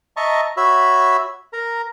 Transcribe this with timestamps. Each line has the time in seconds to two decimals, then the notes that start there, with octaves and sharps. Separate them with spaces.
0.17 D#5 E5 A5 A#5 C#6
0.57 F#4 C#5 E5 B5 E6
1.53 A#4 A#5